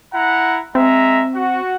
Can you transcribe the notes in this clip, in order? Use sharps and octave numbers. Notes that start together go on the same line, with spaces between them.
E4 F#5 A#5
G#3 C4 E5 A#5
F#4 F#5